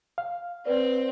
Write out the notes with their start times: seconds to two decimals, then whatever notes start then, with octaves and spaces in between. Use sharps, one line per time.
0.18 F5
0.66 C4 B4 D5